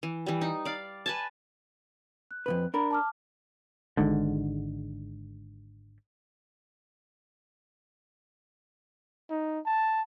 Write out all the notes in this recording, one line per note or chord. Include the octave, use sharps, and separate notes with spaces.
E3
E3 G3
D#4
D5 F5
B4 G#5 A5
F#6
F2 B2 B4
D4 A#4 B5
A5 D6 F6
G#1 G#2 D3
D#4
A5